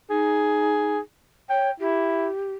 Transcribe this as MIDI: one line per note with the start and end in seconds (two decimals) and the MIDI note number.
0.10 0.98 63
0.10 1.00 68
1.50 1.71 73
1.50 1.70 79
1.80 2.28 64
1.80 2.54 67